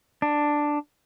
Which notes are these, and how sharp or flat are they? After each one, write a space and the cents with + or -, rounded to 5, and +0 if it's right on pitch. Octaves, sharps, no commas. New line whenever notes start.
D4 +5